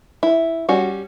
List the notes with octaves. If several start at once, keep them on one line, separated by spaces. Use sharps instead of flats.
E4
G3 C#4 F#4